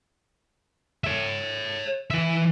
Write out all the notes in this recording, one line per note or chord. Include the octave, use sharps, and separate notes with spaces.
C#5 E5
E3 E5